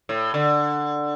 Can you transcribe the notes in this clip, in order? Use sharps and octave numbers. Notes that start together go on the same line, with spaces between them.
A2
D3